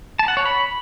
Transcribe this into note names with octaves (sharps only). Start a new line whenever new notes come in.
A5
F#5
C#5
B5